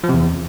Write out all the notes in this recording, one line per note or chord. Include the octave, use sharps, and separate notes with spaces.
F3
C3
E2